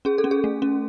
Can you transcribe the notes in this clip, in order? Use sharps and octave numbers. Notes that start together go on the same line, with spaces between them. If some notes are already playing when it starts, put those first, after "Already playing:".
C#4 G#4
A4
C#4
G#4
A3
C#4